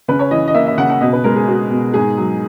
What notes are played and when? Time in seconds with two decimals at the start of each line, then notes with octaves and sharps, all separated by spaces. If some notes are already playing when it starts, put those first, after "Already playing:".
0.08 C#3 B4
0.19 C#5
0.31 E3 D#5
0.48 D#5
0.54 A#3 E5
0.67 E5
0.77 C#3 F#5
0.90 F#5
1.01 B2 D#5
1.13 B4
1.24 G#3 A#4
1.36 G#4
1.48 B3 F#4
1.70 B2
1.94 G#2 G#4
2.17 F#3